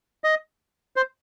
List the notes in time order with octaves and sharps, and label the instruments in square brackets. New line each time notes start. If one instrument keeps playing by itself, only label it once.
[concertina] D#5
C5